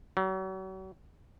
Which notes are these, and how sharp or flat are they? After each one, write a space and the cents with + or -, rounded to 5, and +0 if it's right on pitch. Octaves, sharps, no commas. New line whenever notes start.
F#3 +40